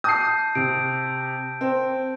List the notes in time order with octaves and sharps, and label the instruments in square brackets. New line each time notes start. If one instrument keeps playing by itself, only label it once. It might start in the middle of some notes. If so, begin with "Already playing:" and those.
[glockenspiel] A5 G6 [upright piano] D#6 C7
[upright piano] C3 [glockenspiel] D7
[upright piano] C4